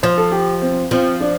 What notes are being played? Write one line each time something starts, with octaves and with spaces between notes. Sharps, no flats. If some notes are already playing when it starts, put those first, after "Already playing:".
F3 C5
A4
G4
C4
F3 C4
D4